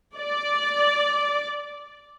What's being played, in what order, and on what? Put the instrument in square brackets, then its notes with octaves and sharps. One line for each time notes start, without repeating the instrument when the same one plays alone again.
[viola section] D5